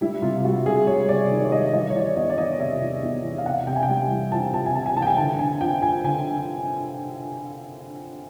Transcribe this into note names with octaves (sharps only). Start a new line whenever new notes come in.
G3 E4
C3 F4
G3 F#4
C3 G#4
G3 C#5
C3 D5
D#3
D5
G3 D#5
E3 D#5
C#5
E3 D5
E2 D#5
D5
E2 D#5
C3 E5
E2
E2
E3
F5
C3 F#5
C3 G5
G#5
G5
G3
E3
F2 A5
C3 A5
G#5
C3 A5
G#5
E3 A5
G5
G#5
D3 A5
D3 G#5
F2 G5
F2 G#5
D3 G#5